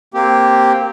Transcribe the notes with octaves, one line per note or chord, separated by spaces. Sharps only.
A#3 C4 G4